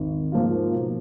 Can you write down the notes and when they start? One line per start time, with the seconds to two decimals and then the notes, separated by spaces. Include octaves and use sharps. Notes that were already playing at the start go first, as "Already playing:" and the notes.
Already playing: G#1
0.32 G#2 F3 A#3 F4
0.74 B2